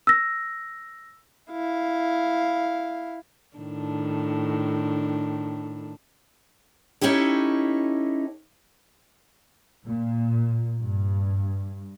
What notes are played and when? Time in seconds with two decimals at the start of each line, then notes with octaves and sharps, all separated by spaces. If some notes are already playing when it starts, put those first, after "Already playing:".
0.07 E6 A#6
1.51 E4 F5
3.56 A2 D#3 D4
7.01 C#4 D#4 E4 G4 A4
9.87 A#2
10.81 G2